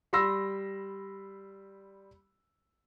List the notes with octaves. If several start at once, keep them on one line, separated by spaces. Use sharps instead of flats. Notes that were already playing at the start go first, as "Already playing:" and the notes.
G3 B5 C6 E6 A#6